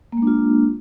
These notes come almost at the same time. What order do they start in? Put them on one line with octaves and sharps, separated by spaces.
A#3 G#3 D4 F4